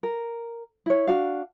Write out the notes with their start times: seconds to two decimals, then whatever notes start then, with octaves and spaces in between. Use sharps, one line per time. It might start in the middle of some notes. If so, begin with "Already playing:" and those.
0.03 A#4
0.86 E4 C#5
1.07 D4 F#4 F5